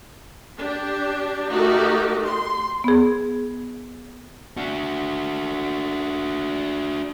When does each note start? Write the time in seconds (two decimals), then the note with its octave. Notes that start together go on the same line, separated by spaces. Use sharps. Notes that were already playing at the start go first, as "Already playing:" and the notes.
0.59 D4 G4
1.50 A3 D#4 F#4 G4 A#4
2.24 C6
2.84 B3 G#4
4.57 D4 F#4